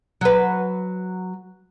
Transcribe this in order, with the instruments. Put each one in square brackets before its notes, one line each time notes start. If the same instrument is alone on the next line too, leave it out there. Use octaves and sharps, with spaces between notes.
[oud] F#3 B4